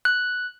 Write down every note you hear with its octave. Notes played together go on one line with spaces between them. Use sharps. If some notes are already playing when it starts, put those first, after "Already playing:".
F#6